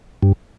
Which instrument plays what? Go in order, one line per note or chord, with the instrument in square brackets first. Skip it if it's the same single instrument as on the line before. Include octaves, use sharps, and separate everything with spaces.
[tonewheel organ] G2